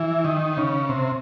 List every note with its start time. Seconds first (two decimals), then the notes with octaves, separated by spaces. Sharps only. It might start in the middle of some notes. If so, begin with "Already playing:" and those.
Already playing: E3
0.24 D#3
0.57 C#3
0.89 C3